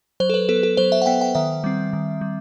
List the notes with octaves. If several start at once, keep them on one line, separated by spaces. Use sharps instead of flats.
F#3 C5
A4
B4
B3 A4
A4
F#3 C5
E5
F#5
B3 G5
G5
D#3 E5
G3 C4
D#3
G3